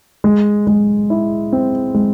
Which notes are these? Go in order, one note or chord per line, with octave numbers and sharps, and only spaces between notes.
G#3
G#3
E4
C4
G#3